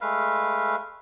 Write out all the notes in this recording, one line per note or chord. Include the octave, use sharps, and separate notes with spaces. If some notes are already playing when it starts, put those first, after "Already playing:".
G#3 A3 B4 F5